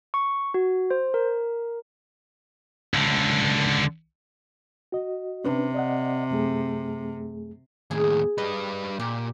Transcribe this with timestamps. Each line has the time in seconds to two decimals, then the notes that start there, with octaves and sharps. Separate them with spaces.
0.14 C#6
0.54 F#4
0.91 C5
1.14 A#4
2.94 C#2 D3
4.92 F#4 D#5
5.44 C3 C#4 D4 B4
5.74 D5 D#5 F#5
6.31 F#2 A3 G#4
7.91 D#2 A2 G#4
8.38 G3 B4 D#5
8.99 A#2 G4